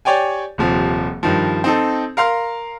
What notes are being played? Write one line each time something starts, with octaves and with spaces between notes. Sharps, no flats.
G4 C#5 D5 G5 G#5
D#1 C3 F3
G2 D#3 F3
C4 D#4 A4
A#4 F5 C6 F6